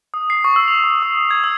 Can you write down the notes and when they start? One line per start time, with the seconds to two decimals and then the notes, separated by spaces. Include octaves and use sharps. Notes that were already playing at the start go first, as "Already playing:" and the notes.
0.14 D#6
0.30 C7
0.44 C#6
0.56 E6
0.68 F7
0.84 C#6
1.02 D#6
1.18 D#6
1.31 G#6
1.44 E6